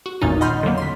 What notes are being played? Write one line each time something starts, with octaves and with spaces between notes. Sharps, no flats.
F#4
G#1 E2 A#2 C#4 D#4 A6
D#5 F#5 B5 C6 F6 G6
D3 F#3 A#3 B3
C6 B6